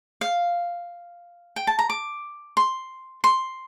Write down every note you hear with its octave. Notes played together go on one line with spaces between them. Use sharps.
F5
G5
A5
A#5
D6
C6
C6